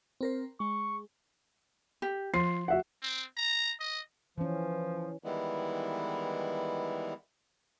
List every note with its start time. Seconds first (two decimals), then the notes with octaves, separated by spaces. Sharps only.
0.21 C4 A#4 C5
0.60 G#3 C#6
2.02 G4
2.34 F3 F4 C7
2.68 F#4 E5 F#5
3.02 C4
3.37 A#5
3.80 D#5
4.38 E3 F3 C#4
5.24 D#3 E3 G3 G#3 B3 E4